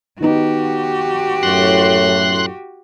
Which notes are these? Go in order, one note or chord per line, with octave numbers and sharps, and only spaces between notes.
D#3 B3 D#4 F#4 G4
F#2 A2 C6 F#6